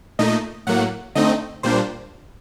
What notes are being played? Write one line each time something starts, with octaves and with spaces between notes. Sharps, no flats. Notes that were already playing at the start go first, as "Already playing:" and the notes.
A#2 A3 D#4 D#5
A2 F#3 A#3 F#5
D3 A3 C4 D#4 D#5
A#2 G3 A#3 D4 C5